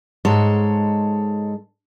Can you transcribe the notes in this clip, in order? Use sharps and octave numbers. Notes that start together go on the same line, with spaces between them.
G#2 G#3 A4 C#5